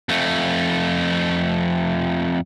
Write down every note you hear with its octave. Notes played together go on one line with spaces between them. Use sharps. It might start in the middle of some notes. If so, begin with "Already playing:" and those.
F2 A3